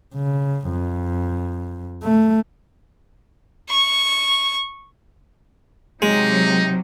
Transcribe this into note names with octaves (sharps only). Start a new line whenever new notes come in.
C#3
F2
A3
C#6
C3 F#3 G#3 D#4